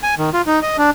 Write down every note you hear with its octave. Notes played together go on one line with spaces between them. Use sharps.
G#5
D#3
F4
D#4
D#5
D4